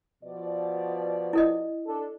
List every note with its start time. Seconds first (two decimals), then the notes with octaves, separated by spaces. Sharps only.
0.24 B2 F3 D5
1.33 E4 A4 D#5
1.86 D4 A4